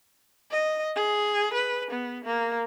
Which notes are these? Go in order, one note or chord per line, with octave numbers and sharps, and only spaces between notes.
D#5
G#4
B4
B3
A#3